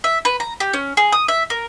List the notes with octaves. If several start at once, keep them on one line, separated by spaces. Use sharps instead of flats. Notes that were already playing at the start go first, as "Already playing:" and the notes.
E5
B4
A#5
G4
C#4
G#4
D#6
E5
A#4